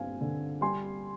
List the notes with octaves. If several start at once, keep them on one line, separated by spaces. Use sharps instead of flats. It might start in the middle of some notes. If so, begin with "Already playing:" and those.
Already playing: G2 C4 F5 G#5
D3
G3 G#5 C6